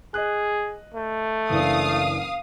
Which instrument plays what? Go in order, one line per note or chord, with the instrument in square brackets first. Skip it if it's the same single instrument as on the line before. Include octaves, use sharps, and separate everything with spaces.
[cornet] G#4 [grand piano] D#5 F#6
[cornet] A3
[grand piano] F#1 E3 D4 [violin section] F5 D#6